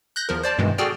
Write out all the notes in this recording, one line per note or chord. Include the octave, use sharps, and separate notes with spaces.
F#6 G6 A#6
E2 F3 A#4
C5 D5 A5
G2 B2 D#3 E3 G#3
F#4 G#4 A4 D5 G5 F6